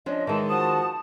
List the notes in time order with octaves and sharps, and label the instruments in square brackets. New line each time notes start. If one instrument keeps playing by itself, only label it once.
[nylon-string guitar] F3 C#4 D4 [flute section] D#5
[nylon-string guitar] D#3 G#3 [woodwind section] E3 [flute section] A5
[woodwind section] F3 F#4 [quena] D#6